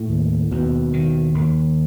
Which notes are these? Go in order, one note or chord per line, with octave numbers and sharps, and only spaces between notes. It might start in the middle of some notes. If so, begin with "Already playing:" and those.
Already playing: A2
D#2
D#2 B2
D#3
D#2